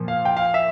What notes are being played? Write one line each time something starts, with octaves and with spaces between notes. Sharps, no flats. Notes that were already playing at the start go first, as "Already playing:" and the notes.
Already playing: A#2 F3
F5
G5
F5
E5